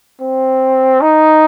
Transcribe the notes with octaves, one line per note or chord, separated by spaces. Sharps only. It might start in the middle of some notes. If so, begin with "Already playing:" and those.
C4
D#4